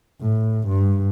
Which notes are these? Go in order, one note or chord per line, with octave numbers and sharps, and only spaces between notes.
A2
G2